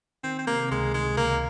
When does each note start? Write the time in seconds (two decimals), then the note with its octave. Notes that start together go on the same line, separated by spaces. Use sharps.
0.24 D#3 C4
0.39 C4
0.47 C3 A#3
0.71 C#2 G#3
0.94 D#3 G#3
1.17 C#2 A#3